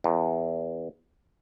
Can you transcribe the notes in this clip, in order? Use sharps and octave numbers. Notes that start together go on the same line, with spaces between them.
E2